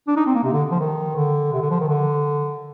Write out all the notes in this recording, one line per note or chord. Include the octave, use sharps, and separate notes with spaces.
D4
D#4
C4
A#3
C3
D3
F3
D#3
D3
C3
D3
F3
D#3
D3